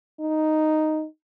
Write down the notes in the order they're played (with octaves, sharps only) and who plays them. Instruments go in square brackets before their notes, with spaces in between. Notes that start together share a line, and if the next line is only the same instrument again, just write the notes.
[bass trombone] D#4